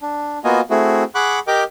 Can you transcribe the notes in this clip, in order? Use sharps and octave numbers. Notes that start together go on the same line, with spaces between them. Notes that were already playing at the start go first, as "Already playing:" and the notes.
D4
A#3 B3 F4 F#4 D#5 G#5
A3 C4 E4 F#4 G#4
G#4 F#5 B5 C#6 D6 F#6
G4 A#4 D#5 G5 D6